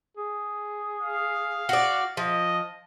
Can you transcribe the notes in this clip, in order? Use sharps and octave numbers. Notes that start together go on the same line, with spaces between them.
G#4
F5
F#4 D5
F3 D#5